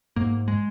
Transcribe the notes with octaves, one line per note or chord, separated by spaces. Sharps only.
G#2 A#3
G#3